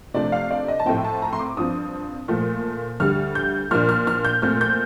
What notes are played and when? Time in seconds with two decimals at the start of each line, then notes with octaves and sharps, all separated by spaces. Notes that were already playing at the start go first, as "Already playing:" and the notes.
0.14 C3 F3 A3 D4 D5
0.32 F5
0.51 D5
0.68 D#5
0.79 A5
0.86 A2 F3 C4 G5
0.97 G5
1.04 A5
1.22 A#5
1.33 C6
1.39 D6
1.57 G2 F3 C4 D#6
2.28 A#2 F3 A3
3.00 D2 D3 G3 F6
3.35 G6
3.71 A#2 F3 A#3 D4 F6
3.89 F6
4.07 F6
4.25 G6
4.42 A#2 A3 C4 F6
4.61 G6